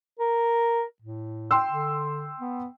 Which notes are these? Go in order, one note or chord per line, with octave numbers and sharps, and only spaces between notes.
A#4
A2
G5 C6 E6
D3
B3